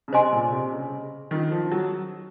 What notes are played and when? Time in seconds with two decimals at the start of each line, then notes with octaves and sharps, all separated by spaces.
0.08 C#3
0.13 C3 C5 D#5 G#5 C6
0.33 A#2
0.52 C3
0.72 C#3
1.31 D#3 C#4 F4 A#4
1.51 F3
1.72 F#3